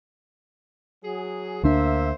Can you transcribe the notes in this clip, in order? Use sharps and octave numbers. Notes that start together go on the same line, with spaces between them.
F#3 G#4
D2 A#3 D4 C5 E5